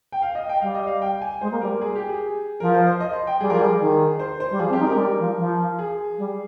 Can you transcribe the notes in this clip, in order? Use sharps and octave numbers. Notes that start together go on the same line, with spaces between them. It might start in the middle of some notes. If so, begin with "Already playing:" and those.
G5
F5
D#5
G5
G3 F5
D#5
F5
G5
G#5
G#3 C5
A#3
G3 A#4
G#4
G4
G#4
F3 A#4
C5
C5
D#5
C6
G5
G3 G#4
F3 A#4
G3 G#4
D#3
C5
C5
G3
F3 G#4
C4
G4
D#4
C#4 A#4
G#3
G3
F3
F3
G#4
G3